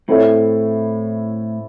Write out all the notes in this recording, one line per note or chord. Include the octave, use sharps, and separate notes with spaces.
A2 C4 E4 A4 C#5 E5